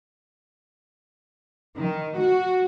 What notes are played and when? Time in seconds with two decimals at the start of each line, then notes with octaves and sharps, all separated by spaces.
1.77 D#3
2.20 F#4